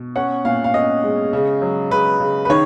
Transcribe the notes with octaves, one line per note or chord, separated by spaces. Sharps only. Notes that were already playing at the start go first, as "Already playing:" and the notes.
Already playing: B2
C#4 F#5
A#2 F5
F5
C#4 D#5
G#3
C#3
F#3
C#3 B4
C#3
B4
D#3 C#5